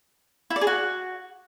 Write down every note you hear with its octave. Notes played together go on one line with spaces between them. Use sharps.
E4
D5
G#4
F#4